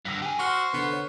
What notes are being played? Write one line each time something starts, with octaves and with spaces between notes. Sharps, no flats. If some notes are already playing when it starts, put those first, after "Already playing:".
G2 D3 E6 A#6 B6
G4 G#5
F#4 C5 C#6 F6
D3 B3
C#5